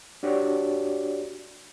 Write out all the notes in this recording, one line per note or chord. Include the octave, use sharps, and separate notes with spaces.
D4 F#4 G4 C#5 D5